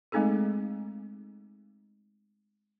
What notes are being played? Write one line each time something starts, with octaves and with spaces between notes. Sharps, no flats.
G#3 A3 C4 D#4 G#4 A4